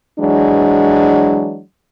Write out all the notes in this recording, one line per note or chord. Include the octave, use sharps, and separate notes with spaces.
E3 F#3 G#3 D4